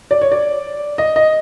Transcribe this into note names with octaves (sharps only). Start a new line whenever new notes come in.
D5
C#5
D5
D#5
D#5